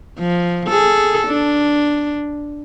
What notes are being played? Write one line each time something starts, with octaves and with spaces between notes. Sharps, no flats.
F3
G#4 A4
D4